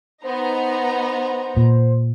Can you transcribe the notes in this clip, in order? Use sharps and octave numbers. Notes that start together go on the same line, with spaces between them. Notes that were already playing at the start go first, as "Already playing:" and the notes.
B3 D#4 C5 A#5
A#2